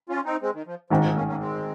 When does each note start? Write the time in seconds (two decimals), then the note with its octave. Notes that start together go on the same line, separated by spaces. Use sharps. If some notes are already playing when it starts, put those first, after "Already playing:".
0.09 C#4 F4
0.25 C4 D#4
0.42 G#3 C4
0.54 D#3
0.66 F3
0.90 G#1 G#2 D#3 F3
1.03 F3
1.15 A#3 C#4
1.27 A#3 C#4
1.39 G#3 C4